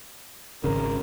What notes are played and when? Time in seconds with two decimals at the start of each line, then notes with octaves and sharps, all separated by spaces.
0.64 G#1 C#3 A#4